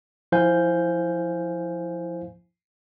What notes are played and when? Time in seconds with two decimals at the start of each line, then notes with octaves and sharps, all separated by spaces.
0.32 F3 E4 C5 F5 G#5 G6